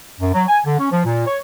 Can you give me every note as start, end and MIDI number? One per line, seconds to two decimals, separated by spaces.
0.20 0.33 42
0.33 0.44 54
0.48 0.59 80
0.65 0.76 50
0.79 0.90 61
0.92 1.02 53
1.05 1.25 46
1.27 1.38 73